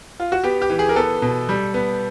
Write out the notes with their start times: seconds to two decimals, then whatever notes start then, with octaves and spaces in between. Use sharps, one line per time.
0.20 F4
0.32 F#4
0.44 B3 G4
0.62 G4
0.70 E3
0.79 G#4
0.89 A#4
0.96 B3 A4
1.22 B2
1.49 G3
1.74 B3